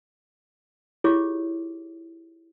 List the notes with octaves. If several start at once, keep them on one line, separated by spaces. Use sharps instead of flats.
E4 F4 G4 G#4 C#5 D6